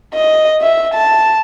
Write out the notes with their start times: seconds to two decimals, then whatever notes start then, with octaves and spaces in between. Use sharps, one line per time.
0.14 D#5
0.62 E5
0.94 A5